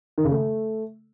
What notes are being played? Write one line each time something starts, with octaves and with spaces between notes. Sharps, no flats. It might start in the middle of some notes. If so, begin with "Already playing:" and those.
D#3
C#3
A3